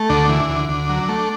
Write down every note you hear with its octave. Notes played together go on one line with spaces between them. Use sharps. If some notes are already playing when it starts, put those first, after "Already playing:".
Already playing: A3
D2 D4
E3
D2
D2
F#3
A3